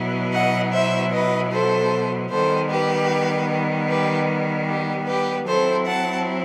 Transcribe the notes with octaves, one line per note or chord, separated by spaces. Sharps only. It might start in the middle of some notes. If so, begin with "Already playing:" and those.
Already playing: B2 F#3 B3 E4
D#5 F#5
C5 E5
B4 D#5
A4 C5
D#3 G3 B3 A4 C5
G4 B4
G4 B4
G4
G4 B4
F#3 C4 E4 A4 C5
F#5 A5